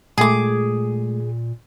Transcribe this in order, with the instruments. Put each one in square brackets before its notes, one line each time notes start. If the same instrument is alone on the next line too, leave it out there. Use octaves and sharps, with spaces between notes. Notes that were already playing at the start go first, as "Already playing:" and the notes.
[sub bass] A#2 [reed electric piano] G#3 A3 [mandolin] G#4 D6